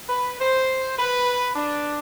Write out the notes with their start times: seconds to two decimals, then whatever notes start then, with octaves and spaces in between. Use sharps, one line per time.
0.09 B4
0.39 C5
0.97 B4
1.55 D4